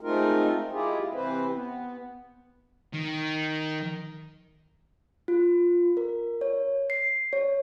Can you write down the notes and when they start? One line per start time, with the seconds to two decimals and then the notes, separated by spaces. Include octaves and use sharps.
0.01 G#3 A3 C4 D#4 F4 A#4
0.72 G#3 E4 F4 G4 G#4
1.14 C3 E3 C4 B4 C5
1.53 B3
2.93 D#3
5.28 F4
5.97 A#4
6.41 C#5
6.90 C7
7.33 C#5